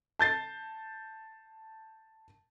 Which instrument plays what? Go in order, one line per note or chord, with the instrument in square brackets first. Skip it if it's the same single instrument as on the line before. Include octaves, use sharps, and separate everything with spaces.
[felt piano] A5 G6 A6 C7